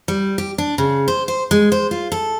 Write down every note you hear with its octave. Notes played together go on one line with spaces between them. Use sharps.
G3
G4
D4
C#3
C5
C5
G#3
C5
F4
A4